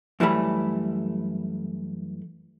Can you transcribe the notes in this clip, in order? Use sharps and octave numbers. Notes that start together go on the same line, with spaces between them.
F#2 E3 G3 A3 B5